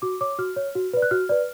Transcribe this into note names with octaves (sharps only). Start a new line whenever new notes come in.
F#4 D6
C#5 D6
F#4 F6
C#5
F#4
B4 D5
F#6
F#4 F6
B4 D5